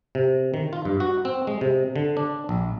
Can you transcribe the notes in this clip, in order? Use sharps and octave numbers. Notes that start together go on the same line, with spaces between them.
C3
D#3
F4
G2
F#4
C4
G#3
C3
D3
D4
A#1